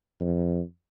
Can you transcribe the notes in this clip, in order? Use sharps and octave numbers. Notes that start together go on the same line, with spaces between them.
F2